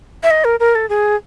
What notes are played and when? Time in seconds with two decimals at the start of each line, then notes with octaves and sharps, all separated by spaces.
0.23 E5
0.30 D#5
0.44 A#4
0.60 A#4
0.75 A4
0.89 G#4